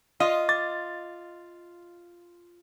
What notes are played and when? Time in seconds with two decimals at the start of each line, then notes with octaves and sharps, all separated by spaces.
0.20 F4 D#5 F5
0.49 D6 A6